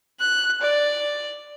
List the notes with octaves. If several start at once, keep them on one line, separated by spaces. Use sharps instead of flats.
F#6
D5